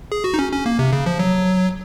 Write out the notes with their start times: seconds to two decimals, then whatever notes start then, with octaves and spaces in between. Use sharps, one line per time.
0.12 G#4
0.24 F#4
0.34 D#4
0.39 C#4
0.52 C#4
0.66 A#3
0.79 C3
0.93 C#3
1.06 F3
1.19 F#3